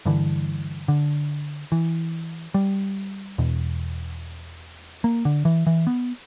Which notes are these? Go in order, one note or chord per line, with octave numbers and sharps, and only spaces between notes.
G2 D3 E3
D3
E3
G3
E2 B2
A#3
D3
E3
E3
B3